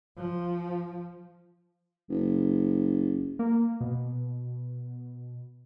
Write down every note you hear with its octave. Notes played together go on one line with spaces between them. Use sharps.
F3
F#1
A#3
B2